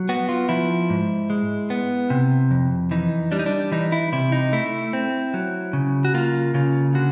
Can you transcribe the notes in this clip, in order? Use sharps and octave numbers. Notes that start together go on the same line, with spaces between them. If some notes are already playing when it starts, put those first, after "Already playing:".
Already playing: F#3
B3 F#4
F4
F3 E4
G#2
G#3
B3
C3
F2
E3 D#4
G3 D4
D#4
D4
E3 D#4
E4
C3 E4
D#4
A3 E4
C4
F#3
C#3
F#4
A#3 F4
C#3 F4
D3 F#4